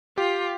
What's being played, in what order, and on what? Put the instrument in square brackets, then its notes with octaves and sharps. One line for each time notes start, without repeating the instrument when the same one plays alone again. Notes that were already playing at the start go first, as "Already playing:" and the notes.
[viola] F4 [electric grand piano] G4